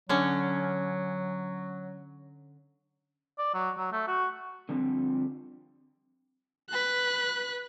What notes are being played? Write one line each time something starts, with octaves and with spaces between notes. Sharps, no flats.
D3 F#3 C#4
D5
F#3
F#3
A3
F#4
D3 F3 G3 A#3 C4
B4 F#6